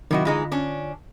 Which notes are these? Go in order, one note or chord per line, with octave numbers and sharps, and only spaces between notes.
C3 D#3 F#3 E4 F#4 D#5
D3 E3 G#3 D#4 F4
C#4 D4